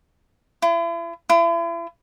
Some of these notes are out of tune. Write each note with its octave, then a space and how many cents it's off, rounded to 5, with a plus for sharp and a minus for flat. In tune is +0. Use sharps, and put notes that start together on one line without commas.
E4 +40
E4 +40